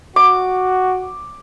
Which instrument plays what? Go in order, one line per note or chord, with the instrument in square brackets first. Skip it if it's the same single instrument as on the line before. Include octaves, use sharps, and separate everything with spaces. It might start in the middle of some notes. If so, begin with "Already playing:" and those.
[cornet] F#4 [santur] D6